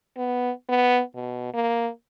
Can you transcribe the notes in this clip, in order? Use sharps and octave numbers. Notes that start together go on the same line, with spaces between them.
B3
B3
B2
A#3